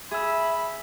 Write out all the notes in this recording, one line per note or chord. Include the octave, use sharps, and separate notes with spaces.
G#4 E5 B5 E6